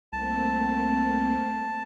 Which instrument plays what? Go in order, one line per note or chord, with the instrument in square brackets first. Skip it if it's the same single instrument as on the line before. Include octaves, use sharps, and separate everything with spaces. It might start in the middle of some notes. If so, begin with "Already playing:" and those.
[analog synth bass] C2 [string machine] A3 A#3 C4 [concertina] A5